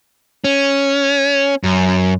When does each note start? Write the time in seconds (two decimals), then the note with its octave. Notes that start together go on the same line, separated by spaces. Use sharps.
0.44 C#4
1.63 F#2